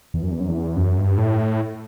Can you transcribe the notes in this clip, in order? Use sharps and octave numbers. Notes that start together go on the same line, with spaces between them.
E2
F#2
E2
F#2
E2
F#2
G2
A2